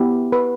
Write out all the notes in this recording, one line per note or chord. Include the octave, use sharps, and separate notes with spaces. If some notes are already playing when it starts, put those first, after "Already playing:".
Already playing: B3 E4 G4
B4